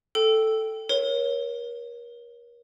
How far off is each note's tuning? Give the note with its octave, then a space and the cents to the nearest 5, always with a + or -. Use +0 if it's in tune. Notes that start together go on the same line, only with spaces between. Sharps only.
A4 +0 G5 -5
A#4 +35 C#5 -5